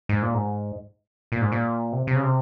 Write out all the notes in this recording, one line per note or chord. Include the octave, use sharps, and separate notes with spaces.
G#2
A#2
G#2
A#2
G#2
A#2
C3
C3
C#3
C3